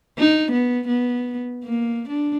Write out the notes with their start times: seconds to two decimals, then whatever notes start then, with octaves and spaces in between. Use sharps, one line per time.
0.19 D#4
0.52 B3
0.88 B3
1.65 A#3
2.09 D4